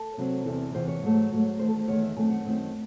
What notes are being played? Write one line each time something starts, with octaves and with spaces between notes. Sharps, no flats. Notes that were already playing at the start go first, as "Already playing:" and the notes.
Already playing: A4
C3 F#3 C4
E2 C3 E3 A4
E2 C3 E3 C5
C#5
G#2 F#3 A3
G#2 F#3 A3
E2 D#3 A3 C5
A4
C5
E2 D#3 A3 C#5
E5
F#2 D#3 A3 C4 G#5
F#5
F#2 D#3 A3 C4